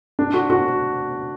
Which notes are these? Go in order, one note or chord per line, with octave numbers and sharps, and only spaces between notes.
D4
F#4
F#4